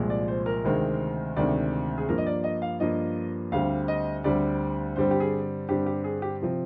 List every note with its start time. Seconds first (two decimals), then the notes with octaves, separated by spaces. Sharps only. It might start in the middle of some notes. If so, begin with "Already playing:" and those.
Already playing: C2 A#2 F3 G#3
0.10 D5
0.28 C5
0.46 A#4
0.64 D2 C3 D#3 G#3 C4
1.36 D2 C3 D#3 G#3 C4 D5
1.98 G#4
2.08 G2 F3 A#3 A#4
2.18 D#5
2.26 D5
2.44 D#5
2.62 F5
2.80 G2 F3 A#3 D#5
3.52 D2 D3 G3 C4 F5
3.88 D#5
4.24 D2 D3 G3 C4 D5
4.96 G2 D3 G3 C4 C5
5.11 G4
5.20 G#4
5.69 G2 D3 G3 C4 G4
5.86 G4
6.04 G#4
6.22 G4
6.42 C3 F3 C4